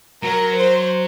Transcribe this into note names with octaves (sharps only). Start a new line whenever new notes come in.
F#3 A#4
C5